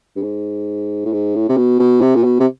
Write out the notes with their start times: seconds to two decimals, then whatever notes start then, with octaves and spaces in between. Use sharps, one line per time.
0.16 G2
0.23 G#2
1.05 A2
1.13 G#2
1.35 A2
1.49 C3
1.57 B2
1.79 B2
2.01 C3
2.16 A#2
2.24 B2
2.40 C3